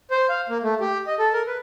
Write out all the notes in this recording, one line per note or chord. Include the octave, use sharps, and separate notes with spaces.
C5
F5
A#3
A3
G4
D#5
A4
A#4
B4